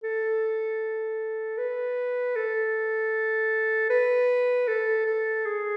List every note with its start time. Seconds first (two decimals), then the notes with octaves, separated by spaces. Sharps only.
0.03 A4
1.58 B4
2.36 A4
3.90 B4
4.68 A4
5.06 A4
5.45 G#4